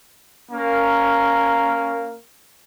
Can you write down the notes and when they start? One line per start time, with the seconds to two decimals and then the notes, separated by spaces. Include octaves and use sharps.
0.51 A#3 C#4 A#4